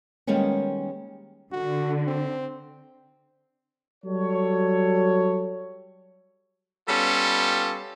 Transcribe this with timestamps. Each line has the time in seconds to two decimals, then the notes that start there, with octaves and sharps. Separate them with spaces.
0.27 D#3 G3 G#3 A#3 B3 C#4
1.52 D3 F#4
2.07 C4
4.05 F#3 G3 A4 C#5
6.89 G3 B3 C#4 F4 A4